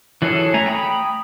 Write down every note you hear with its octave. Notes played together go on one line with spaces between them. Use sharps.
E3 F#3 C#4 G#4 A4
A3 G#5 A#5
G5 A#5 B5 D#6